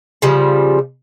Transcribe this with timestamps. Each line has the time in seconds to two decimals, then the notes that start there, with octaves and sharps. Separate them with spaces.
0.22 C#3 F3 G3